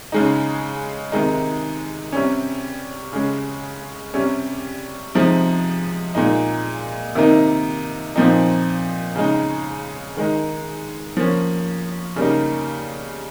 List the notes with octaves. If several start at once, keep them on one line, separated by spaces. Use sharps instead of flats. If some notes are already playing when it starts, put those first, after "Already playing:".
C#3 G#3 D#4
C3 D#3 G#3 D#4
C3 G3 C#4
C#3 G#3 C#4
C3 G3 C#4
C3 F3 G#3 D#4
A#2 G#3 D#4
C3 D#3 A#3 D#4
A#2 F3 C4 D#4
C#3 G#3 D#4
D#3 G#3 D#4
F3 A#3 C#4
C#3 G3 A#3 D#4